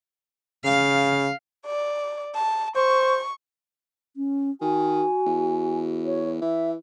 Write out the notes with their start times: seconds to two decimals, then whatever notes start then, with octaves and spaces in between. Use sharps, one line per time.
0.65 C#3 F5
1.66 D5
2.35 A5
2.76 C5 C#6
4.17 C#4
4.61 D#3 F#4 G#5
5.26 E2
6.06 C#5
6.42 E3 E5